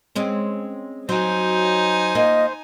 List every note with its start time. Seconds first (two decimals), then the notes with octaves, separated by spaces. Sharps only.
0.16 G#3 C4 C#4
1.09 F#3 D#4 C5 G#5
2.15 A#3 F4 D#5